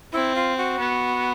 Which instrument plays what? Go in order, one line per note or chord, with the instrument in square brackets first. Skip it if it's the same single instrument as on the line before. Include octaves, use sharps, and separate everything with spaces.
[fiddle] C4 [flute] E4
[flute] F4
F#4
[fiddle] B3